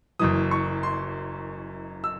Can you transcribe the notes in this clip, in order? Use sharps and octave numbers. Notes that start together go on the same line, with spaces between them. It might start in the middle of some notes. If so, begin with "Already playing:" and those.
F#1 F#2 E3 D#6
C#6
C6
E6